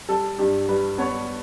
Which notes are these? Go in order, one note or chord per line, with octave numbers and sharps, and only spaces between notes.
G3 A4
G2 G4
G3 B4
B3 C#5